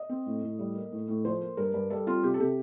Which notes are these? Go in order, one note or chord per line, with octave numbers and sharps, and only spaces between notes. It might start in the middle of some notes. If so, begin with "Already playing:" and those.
Already playing: D#5
C4
A2
A2
G3
A#3
A2
A2
F3 C5
A#3
G2 A#4
G2
G3 A4
C4 F4
C3 G4
A4
C3 G4